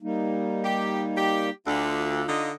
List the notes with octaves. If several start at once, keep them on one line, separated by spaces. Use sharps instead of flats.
G3 A#3 D#4
G4
G4
D2 D3 F4 F5
D3 D#4 D#5